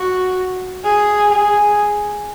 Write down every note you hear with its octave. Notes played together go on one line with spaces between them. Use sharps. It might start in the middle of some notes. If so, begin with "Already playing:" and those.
Already playing: F#4
G#4
G#4